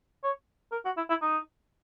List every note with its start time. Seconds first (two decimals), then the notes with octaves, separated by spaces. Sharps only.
0.23 C#5
0.72 A#4
0.85 F#4
0.97 E4
1.10 E4
1.22 D#4